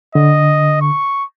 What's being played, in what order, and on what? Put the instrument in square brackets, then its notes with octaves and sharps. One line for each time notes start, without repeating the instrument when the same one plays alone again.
[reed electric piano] D3 [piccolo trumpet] D#5
[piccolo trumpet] C#6